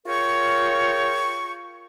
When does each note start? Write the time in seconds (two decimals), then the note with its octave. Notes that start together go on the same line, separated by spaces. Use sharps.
0.06 F4 G#4 A#4 C#5 G5 C#6